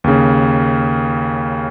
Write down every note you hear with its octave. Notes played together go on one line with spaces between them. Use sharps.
D#2 C#3